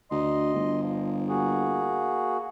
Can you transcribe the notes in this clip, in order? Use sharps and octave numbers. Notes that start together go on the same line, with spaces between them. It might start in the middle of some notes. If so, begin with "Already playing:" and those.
D2 D#5 C6
G1
F3
A#3 F#4 G#4